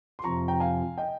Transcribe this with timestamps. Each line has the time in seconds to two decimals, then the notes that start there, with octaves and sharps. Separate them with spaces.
0.19 C6
0.24 F2 C3 F3 A#5 C#6
0.48 G5 A#5
0.60 F5 G#5
0.98 D#5 G5